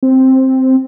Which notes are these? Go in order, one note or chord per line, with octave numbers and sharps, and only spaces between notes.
C4